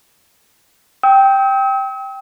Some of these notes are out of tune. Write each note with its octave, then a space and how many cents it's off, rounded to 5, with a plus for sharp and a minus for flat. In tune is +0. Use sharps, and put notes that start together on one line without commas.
G5 +0 E6 -45